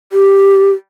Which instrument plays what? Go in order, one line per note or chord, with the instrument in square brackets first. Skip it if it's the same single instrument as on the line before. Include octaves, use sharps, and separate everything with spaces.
[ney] G4